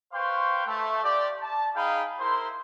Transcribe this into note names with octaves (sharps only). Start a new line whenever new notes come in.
B4 C5 F5 G5 C6 C#6
A3
F4 G4 D5
A5
D#4 G#4 F5 G5 B5
E4 A#4 C5 C6